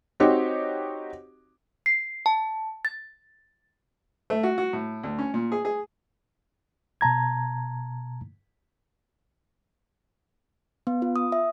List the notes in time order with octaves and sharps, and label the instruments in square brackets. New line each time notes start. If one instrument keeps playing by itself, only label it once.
[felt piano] C4 D#4 F#4 G4 C#5
[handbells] C7
A5
A6
[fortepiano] A3
F#4
F#4
A2
D2
C#4
A#2
G#4
G#4
[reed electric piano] B2 A5 A#5 G#6
[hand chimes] B3
F4
D#6
E5